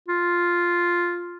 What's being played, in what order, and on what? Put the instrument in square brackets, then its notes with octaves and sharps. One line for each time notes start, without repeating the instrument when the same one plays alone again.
[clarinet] F4